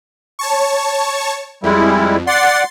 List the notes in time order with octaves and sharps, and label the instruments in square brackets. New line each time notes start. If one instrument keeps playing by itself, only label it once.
[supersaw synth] C#5 A5 C#6
[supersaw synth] F2 [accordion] G3 G#3 E4
[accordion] D5 F#5 [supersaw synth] C6 A6 C7